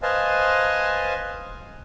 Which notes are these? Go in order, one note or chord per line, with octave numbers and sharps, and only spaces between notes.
B4 C5 D#5 F5 G#5 A5